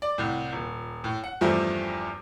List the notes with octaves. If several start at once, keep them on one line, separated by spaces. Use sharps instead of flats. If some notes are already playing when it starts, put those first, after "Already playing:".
D5
C2 A2
D#1
A2
F#5
E2 G2 F3 G3 A3 C4